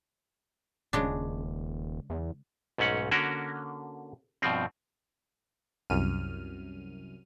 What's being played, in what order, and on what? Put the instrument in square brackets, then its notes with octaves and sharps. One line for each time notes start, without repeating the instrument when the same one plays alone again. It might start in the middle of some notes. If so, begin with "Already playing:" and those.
[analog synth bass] D#1 [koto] C#3 G#3 D4
[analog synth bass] E2
[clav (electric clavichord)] B1 G#2 A3 C#4 F#5
D3 A#3 C#4 F#4 A#4
G2 B2 F3 C4
[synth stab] C2 F#2 F6 D#7